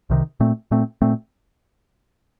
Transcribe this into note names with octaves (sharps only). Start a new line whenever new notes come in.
C2 C3 D#3
A#2 A3 C4
A#2 A3 C4
A#2 A3 C4